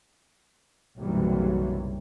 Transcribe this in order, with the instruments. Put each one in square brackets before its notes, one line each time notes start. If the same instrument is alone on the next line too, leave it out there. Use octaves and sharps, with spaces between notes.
[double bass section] F#1 B1 C3 E3 F#3 G3